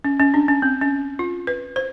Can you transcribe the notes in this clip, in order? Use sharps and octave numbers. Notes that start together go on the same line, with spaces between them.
C#4
C#4
D4
C#4
C4
C#4
F4
B4
C5